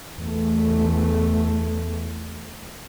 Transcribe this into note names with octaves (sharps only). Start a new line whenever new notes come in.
E2 A3